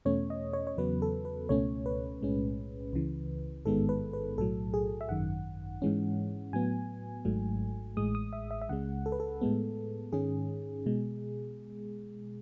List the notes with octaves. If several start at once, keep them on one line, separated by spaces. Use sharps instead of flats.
E2 B2 A3 C#4 C#5
D#5
C#5
C#5
E2 C#3 F#3 B3 B4
A4
B4
C#2 B2 A3 C#4 C#5
B4
B1 A2 G#3 C#4
C#2 C#3 E3
A1 G#2 D#3 G#3 B3 A4
B4
B4
B1 A2 F#3 A4
G#4
E5
G#1 F#2 D#3 F#5
G#2 E3 G#3 C#4
A2 F#3 B3 G#5
G#1 G#2 F#3 A3
A1 A2 G#3 D#6
D#6
E5
E5
E5
C#2 C#3 G#3 F#5
A4
B4
A4
A2 G#3 B3
G#2 D#3 G#3 C#4 G#4
B2 G#3